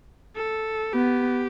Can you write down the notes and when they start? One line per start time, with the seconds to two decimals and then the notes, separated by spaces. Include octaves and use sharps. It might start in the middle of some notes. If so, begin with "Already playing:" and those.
0.37 A4
0.94 B3 G4